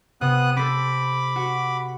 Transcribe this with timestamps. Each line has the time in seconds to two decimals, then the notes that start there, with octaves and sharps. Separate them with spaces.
0.21 C3 B3 D#6 F#6
0.57 C4 A4 B5 D6
1.36 F#4